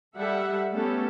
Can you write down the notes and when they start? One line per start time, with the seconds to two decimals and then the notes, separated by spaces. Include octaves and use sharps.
0.16 G3 A4 E5 F#5
0.72 A3 B3 C#4 G4 A4